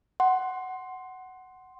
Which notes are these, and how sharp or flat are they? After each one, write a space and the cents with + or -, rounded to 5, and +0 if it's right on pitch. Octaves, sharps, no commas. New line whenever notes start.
F#5 +10 C6 +0